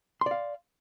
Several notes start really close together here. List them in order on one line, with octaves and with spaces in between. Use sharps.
C6 D5 F5